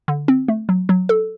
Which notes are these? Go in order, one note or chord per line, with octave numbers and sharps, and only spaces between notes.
D3
C4
A3
F#3
F#3
A4